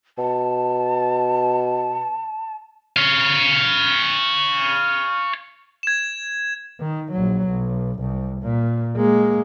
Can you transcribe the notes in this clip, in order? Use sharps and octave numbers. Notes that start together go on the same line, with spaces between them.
B2 A5
C#5 F5
G#6 E7
D#3
A#1 F#3
B1
C2
A#2
G#3 A#3